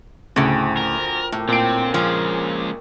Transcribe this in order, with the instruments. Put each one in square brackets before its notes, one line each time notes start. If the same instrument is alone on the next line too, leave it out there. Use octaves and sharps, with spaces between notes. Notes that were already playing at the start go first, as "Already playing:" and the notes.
[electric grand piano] D2 [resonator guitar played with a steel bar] A2 C#3 [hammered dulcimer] C4 E4
[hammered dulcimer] F3 [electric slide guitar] A#4
[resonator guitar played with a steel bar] A2 [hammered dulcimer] A#3 C4 G4
[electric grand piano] A#2 D7 [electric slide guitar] C4 [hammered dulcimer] D4 G4 C#5
[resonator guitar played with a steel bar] F3 [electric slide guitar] G#3 C#4 [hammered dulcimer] F4 A#4 D6